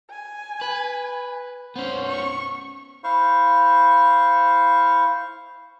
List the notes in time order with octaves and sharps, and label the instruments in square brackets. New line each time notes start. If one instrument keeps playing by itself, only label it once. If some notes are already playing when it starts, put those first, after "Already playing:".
[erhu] G#5
[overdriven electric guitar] B4
[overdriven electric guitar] B3 C#4 [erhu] C5
[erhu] C#6
[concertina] E4 C5 F5 C#6